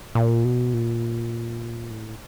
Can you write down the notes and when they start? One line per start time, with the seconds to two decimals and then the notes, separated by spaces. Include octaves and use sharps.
0.15 A#2
0.44 B2
0.74 A#2
1.91 A2